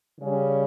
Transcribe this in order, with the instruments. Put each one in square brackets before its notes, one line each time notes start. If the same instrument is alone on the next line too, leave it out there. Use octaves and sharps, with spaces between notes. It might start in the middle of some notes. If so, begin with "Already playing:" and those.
[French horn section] C#3 G3 C#4